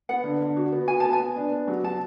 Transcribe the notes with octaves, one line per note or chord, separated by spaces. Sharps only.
B3 F#5
D3
D3
F#4
B3
F#4 G#5
B3 A5
G#5
B3
D4
B3
F#3
F#3 A5